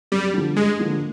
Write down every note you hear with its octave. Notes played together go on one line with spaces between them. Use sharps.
F#2 G3
D3 F3
G2 G#3
D3 F3 A#3